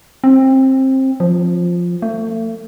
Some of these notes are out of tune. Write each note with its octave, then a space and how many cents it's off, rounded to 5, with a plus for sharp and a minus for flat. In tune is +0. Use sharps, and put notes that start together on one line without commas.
C4 +20
F3 +5
A3 +35